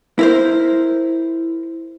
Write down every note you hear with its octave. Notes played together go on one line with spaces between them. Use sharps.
E4 A#4 C5